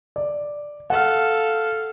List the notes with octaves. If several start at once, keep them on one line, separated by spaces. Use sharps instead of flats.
D5
A4 F5 F#5